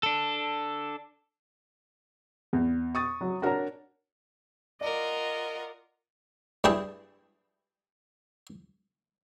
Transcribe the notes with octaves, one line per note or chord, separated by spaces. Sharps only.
D4 A4
E2
C#6 D#6 A6
F#3
D4 F#4 A#4 C#5 A#5
F4 A#4 D5 D#5 F#5
G2 E4 G#4 G5 A5